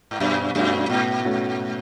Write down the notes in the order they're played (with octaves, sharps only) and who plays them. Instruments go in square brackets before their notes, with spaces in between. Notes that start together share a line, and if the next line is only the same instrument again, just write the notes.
[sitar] G#2
[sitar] F#2 [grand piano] B2
[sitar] F#2 [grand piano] A3 C#4 F#4
[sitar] G#2 [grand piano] B2
[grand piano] A3 C#4 F#4